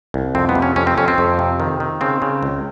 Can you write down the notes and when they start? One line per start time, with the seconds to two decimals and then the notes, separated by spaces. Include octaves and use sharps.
0.14 C2
0.35 F2 C4
0.49 B3
0.55 C3
0.62 C#4
0.76 F2 C#4
0.87 C4
0.97 F2 C#4
1.08 C4
1.18 F2
1.39 C3
1.60 D#3
1.80 D#3
2.01 C#3 C4
2.22 C#3
2.43 C#2